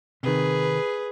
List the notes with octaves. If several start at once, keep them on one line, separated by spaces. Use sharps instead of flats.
C3 D#3 G#4 B4